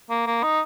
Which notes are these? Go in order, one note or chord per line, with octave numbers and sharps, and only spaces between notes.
A#3
A#3
D#4